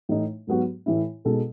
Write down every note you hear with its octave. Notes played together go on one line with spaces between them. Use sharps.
A2 E3 A3 D#4
G#2 F#3 B3 F#4
A2 E3 A3 E4
B2 G#3 D#4 A4